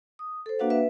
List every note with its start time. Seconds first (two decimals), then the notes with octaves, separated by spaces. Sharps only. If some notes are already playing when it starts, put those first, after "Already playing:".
0.19 D#6
0.46 A4 C5
0.59 A#3 D4 F#4 B4 F5 F#5
0.70 B4 E5